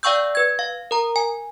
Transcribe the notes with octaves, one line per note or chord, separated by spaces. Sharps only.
D5 F5 G5 C#6 E6 G6
B4 G#6
F5
A#4 A#5
G#5